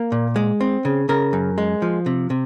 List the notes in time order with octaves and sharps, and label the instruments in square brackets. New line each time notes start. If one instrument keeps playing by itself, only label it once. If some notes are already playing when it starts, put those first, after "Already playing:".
Already playing: [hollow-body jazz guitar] A#3
A#2
G#3
C4
C#3
C#3 A#4
F#2
G#3
F3
C3
C3